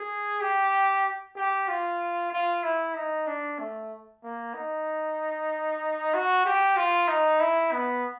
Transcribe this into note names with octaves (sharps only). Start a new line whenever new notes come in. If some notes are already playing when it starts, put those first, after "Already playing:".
Already playing: G#4
G4
G4
F4
F4
E4
D#4
D4
A3
A#3
D#4
F#4
G4
F4
D#4
E4
B3